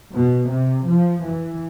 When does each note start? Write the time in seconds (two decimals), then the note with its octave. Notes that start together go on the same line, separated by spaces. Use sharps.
0.15 B2
0.52 C3
0.89 F3
1.26 E3